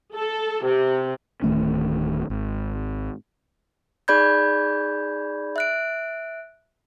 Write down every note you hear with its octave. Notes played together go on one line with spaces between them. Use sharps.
A4
C3
D1 D#3 A3 C#4
G#1
D#4 G#4 D5 B5 G6 G#6
E5 F#6 D7